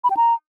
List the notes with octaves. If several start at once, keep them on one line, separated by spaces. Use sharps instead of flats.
B5
G5
A#5